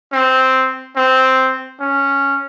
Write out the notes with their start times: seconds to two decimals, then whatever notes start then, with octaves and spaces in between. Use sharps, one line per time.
0.12 C4
0.96 C4
1.80 C#4